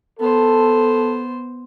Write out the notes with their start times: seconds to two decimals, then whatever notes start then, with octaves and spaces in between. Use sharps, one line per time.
0.20 B3 A4 C5